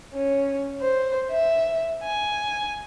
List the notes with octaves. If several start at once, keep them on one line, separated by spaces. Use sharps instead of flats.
C#4
C5
E5
G#5